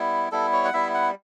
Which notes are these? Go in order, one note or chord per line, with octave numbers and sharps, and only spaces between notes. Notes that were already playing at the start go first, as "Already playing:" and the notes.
Already playing: G3 B3 E4
G3 B3 E4 A4
C#5
F#5
G3 B3 E4 E5
F#5